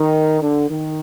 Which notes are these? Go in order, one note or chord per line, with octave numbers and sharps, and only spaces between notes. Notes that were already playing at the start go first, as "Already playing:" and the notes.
Already playing: D#3
D3
D#3